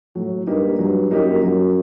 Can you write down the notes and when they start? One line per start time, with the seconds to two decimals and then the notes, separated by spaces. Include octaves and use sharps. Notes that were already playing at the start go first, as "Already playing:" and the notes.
0.15 A2 F#3
0.47 G2 A#3 D#4 G4
0.79 G2 F#3
1.11 F#2 A#3 D#4 G4
1.43 F#3